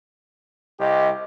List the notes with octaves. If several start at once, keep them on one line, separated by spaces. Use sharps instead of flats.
C2 G4 D#5